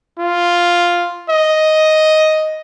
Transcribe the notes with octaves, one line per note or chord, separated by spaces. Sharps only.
F4
D#5